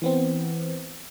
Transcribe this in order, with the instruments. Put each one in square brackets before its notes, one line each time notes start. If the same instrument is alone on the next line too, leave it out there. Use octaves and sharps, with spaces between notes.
[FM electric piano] E3 B3 C4